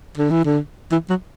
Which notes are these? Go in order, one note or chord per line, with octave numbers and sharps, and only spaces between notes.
D3
E3
D3
E3
F#3